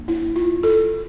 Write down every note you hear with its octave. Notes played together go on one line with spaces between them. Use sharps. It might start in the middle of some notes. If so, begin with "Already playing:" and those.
Already playing: G3 A#3 D4
E4
F4
A4